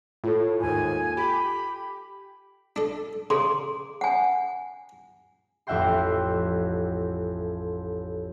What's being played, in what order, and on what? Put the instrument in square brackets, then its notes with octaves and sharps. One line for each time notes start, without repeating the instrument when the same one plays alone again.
[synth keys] A2 [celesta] F4 A4
[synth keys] D#2 G#2 [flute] G#5
[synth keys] G4 [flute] B5
[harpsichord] D4 A4
[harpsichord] C#3 [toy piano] G#4 C6
[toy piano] F#5 G#5
[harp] A1 F2 E5 F#5 G5 C6